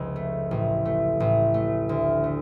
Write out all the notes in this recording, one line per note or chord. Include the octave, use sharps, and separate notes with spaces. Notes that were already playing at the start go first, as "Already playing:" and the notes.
Already playing: F1 C#2
A3
A1
A3
A1
A3
D2
A3